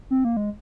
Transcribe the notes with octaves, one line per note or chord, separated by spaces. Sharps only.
C4
A#3
G#3